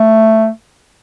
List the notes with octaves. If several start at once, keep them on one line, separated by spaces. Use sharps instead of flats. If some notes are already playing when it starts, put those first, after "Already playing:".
Already playing: A3